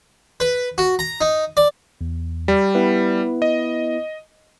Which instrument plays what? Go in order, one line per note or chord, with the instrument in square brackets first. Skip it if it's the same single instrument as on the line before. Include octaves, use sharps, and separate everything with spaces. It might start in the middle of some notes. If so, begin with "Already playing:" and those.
[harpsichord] B4
F#4
A#5
D#4
D5
[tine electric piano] E2
[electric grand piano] G3
[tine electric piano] B3 E4 B4
[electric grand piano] D#5